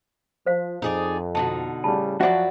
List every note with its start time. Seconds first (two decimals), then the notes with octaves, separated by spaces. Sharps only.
0.46 F3 C5 F5
0.82 F2 D#4 G#4 D5
1.35 B2 D3 D#4 A5
1.84 A2 C#3 G3 A5 B5
2.21 F#2 F3 F#3 F#4 B4 D5 E5 F#5